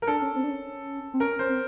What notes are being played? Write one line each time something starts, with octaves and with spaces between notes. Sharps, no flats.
A#4
D4 A4
C#4
C4
D4
C#4
C4
C#4 A#4
C#4 C5
C4